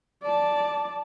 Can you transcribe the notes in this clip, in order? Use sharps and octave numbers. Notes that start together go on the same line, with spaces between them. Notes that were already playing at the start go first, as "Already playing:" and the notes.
D5 A5